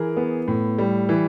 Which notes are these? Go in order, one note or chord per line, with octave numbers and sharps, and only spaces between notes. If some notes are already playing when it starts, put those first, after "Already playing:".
Already playing: E3 G#4 A#4
B3
A2
G3
E3